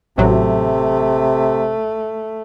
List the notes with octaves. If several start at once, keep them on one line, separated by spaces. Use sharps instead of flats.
A1 C3 F#3 A3